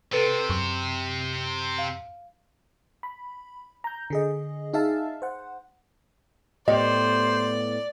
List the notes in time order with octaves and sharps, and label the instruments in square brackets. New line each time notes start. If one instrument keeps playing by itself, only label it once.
[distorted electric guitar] C3 [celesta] A4 B4 A6
[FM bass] F#2 [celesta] C#6
[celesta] F5
[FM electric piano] B5
A#5 G6
D3 G#4 D#5
D#4 G#4 E5 F5 A5
C5 F#5
[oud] A2 B3 G4 [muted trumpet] C5 [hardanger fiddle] D5 [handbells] D#5